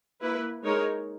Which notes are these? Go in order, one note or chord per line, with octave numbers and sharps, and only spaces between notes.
A#3 E4 B4
G#3 D#4 A#4 C#5